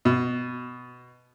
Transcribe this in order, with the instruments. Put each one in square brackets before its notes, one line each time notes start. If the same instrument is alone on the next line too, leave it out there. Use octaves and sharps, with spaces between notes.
[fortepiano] B2